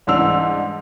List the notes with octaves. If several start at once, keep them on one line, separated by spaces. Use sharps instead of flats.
C2 G#2 E3 D4 E6 F7